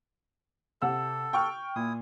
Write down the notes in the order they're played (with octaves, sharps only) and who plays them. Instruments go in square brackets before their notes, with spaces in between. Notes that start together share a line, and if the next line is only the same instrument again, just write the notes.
[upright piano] C3 F#5 E6 [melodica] A4
[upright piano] G5 C#6 F6
[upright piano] A#2 [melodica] E4 D#6